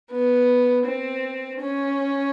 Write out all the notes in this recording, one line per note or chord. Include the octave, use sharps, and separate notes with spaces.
B3
C4
C#4